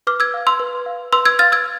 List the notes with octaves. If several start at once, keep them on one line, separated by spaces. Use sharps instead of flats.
B4 D6 F6
E6 G#6
F5
C6 E6
B4
F5
B4 C6 E6
E6 G#6
F5 F6 A6
E6 G#6